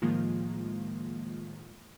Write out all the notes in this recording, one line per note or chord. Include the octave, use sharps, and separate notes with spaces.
A2 D#3 F3 G#3 A#3 F4